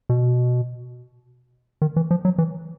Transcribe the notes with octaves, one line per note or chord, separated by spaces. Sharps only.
B2
D#3
E3
F3
F#3
E3